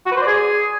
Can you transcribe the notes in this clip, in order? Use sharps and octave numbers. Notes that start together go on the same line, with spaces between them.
F#4
B4
C5
D5
G#4